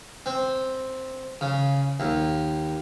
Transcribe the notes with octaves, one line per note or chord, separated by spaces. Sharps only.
C4
C#3
D#2